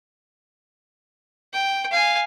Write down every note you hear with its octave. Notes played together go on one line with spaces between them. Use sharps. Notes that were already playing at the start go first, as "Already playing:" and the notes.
G5
F5 G#5